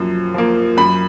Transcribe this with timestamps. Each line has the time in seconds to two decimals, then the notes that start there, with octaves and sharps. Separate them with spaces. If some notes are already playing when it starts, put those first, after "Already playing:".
Already playing: F#2 F3 A#3
0.34 F3 A#3
0.77 F#2 B5